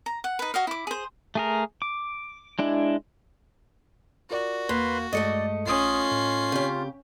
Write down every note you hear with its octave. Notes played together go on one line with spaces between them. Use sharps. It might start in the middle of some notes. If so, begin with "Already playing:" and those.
A#5
F#5
D#4 B4
F#4 D#5 F5
E4 D6
G#4 C5
A3 G#4 A#4
D6
G#3 D4 E4
F4 F#4 A#4 D5
E2 A#3 B4 C6
G2 G#3 A3 A4 D5 D#5 C#7
A#1 C#4 F4 D#6 C7
A2
C#3 C4 G4